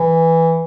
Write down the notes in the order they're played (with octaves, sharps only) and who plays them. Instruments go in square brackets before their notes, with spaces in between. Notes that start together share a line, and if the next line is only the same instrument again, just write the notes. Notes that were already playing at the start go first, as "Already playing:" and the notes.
Already playing: [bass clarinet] E3